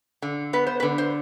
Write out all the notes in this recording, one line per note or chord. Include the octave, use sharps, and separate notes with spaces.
D3
B3 B4
C5
B4
D3
C5